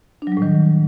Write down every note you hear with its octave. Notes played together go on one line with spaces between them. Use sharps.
D4
F#3
G3
A2
D#3